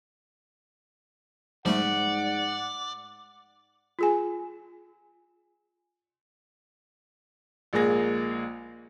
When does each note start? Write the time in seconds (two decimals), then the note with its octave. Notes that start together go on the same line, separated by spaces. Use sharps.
1.66 G#2 F3 G3 A3 D5 F#5
3.99 F4 G#4 G#5
7.73 A#1 G#3 A#3 G#4 A#6